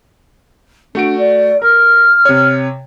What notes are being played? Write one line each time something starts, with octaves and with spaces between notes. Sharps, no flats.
A3 D4 F#4 D7
D5
A#4 F6
C3 C#5